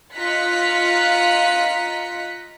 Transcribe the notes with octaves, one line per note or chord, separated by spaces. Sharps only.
F4 D#5 A#5 F#6 B6 C#7